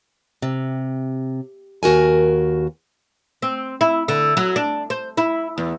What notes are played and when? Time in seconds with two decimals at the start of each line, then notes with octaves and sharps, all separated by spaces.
0.42 C3
1.83 D#2 F#4 A#4 G#5
3.42 C4
3.81 E4
4.08 D3
4.37 F#3
4.56 D4
4.90 C5
5.17 E4
5.58 E2